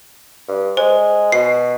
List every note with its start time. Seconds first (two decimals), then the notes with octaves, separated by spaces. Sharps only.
0.48 G2
0.77 G#3 C5
1.32 B2 C7